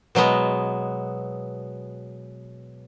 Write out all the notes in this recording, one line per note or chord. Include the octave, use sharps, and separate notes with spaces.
B2 F#3 G#3 B3